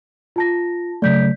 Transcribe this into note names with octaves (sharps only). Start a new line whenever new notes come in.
F4 A5 A#6
C#3 F#3 A3 D5 G6 B6